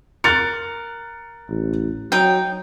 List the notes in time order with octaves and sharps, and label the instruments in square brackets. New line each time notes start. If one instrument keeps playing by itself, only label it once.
[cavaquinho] A#4 [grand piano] F#6 A6 C#7
[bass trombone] A1
[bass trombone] F#3 [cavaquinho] D#4 G5